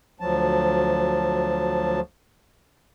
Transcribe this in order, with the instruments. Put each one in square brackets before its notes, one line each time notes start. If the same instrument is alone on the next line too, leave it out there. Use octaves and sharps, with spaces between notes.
[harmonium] D2 F3 F#3 A5